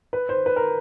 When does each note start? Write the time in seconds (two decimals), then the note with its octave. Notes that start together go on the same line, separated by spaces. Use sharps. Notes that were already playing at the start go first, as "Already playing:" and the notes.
0.13 B4
0.29 C5
0.46 B4
0.56 A#4